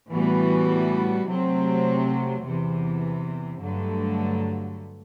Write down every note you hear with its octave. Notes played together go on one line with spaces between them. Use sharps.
A2 E3 G3 B3 F#4
C3 F#3 A3 C4
E2 C3 E3
G2 D3 F#3 A3